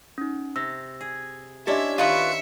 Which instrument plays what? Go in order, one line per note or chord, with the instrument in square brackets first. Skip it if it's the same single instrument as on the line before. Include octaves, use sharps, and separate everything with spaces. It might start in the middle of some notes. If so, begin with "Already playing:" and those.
[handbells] C#4 D#4
[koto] C3 [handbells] E6 A#6
[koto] G#4
[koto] C#4 D4 E4 [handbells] G4 D#5 [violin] E5
[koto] D#3 [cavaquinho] F4 B4 C#6 [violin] E5 C#7